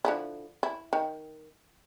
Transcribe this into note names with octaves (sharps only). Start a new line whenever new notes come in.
D3 F3 E4
E4
D#3